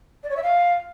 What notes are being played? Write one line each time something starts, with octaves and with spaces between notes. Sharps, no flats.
D5
C#5
E5
F5